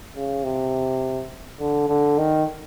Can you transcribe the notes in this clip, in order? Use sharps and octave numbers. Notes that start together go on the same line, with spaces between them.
C#3
C3
D3
D3
D#3